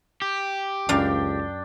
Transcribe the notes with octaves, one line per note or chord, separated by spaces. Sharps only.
G4
C#2 F#2 D4 F5 G5